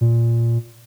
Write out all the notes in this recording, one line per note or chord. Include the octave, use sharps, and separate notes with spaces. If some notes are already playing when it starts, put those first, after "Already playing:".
A#2